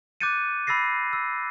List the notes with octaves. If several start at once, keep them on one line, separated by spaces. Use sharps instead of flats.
D6 F#6 G6 A6 C#7 D#7
B5 E6 A6 A#6 C7
E6